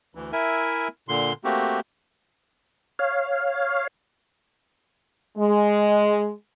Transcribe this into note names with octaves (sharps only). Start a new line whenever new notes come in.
D2 E3
E4 A#4 E5 G#5
A#2 D3 C6
A3 A#3 C4 F#4 G4
C#5 F5
G#3